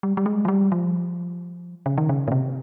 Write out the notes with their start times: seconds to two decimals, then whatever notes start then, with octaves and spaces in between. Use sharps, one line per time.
0.03 G3
0.17 G3
0.26 G#3
0.45 F3
0.48 G3
0.72 F3
1.86 C#3
1.98 D#3
2.09 C#3
2.28 A#2
2.32 C3